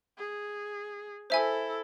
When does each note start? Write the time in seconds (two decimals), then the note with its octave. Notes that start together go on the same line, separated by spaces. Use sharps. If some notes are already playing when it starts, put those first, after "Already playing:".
0.18 G#4
1.30 E4 A4 C5 E5 G#5